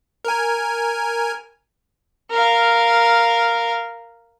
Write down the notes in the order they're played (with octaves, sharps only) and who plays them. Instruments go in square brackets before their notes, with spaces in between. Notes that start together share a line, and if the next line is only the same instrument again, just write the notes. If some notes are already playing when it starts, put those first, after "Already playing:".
[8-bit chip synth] A#4 G#5
[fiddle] A#4 F5